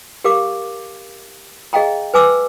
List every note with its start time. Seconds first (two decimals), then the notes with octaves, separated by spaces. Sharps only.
0.24 G4 A#4 F5 D6
1.73 G#4 D#5 F5 G5 A#5
2.14 B4 G#5 D6 E6